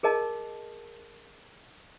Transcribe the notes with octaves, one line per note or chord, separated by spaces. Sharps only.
G#4 A#4 D#5 A5